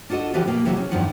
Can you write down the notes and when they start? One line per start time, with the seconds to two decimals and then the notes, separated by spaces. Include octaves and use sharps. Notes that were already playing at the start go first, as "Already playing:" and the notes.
0.10 D4 F4 F#4 A4 D#5
0.34 D3 E3 F3 C4 F#4 G4
0.47 B2 A#3
0.65 C3 E3 F#3 G#3 F#4
0.77 C#4
0.91 E2 G2 D#3 F3 F#5